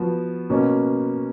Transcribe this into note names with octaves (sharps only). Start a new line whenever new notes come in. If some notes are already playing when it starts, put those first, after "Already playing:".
Already playing: F3 B3 F#4
B2 A#3 C#4